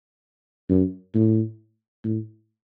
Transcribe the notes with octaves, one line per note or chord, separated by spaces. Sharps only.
F#2
A2
A2